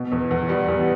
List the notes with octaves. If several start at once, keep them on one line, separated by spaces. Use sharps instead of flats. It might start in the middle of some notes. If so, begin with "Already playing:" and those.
Already playing: B2
E2
E2
G3
E2